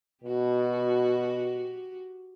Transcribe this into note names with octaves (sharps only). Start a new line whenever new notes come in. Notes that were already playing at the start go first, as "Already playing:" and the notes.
B2 F#4 G4